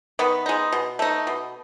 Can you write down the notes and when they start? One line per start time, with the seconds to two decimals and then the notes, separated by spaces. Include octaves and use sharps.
0.19 D#3 B3 B4
0.46 G#3 D#4
0.72 B2
0.99 A3 D#4
1.27 B2